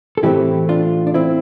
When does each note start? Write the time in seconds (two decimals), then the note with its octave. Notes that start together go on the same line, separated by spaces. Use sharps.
0.18 A4
0.23 A2 E3 A3 C4 E4 G4
0.69 D4 F4
1.07 D4
1.14 C4 E4